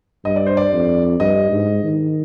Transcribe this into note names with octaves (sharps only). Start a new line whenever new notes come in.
G2 D#5
D5
C5
D5
F2
G2 D#5
G#2
D#3